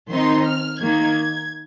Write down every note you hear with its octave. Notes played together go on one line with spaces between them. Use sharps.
D#3 C4 D#4 C6
F6
D#3 A#3 D#4 G#6